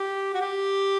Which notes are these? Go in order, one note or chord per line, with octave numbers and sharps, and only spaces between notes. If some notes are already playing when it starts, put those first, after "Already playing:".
Already playing: G4
F#4
G4